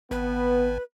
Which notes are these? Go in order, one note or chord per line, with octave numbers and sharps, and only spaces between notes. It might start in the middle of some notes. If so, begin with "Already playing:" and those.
G#1 B3 B4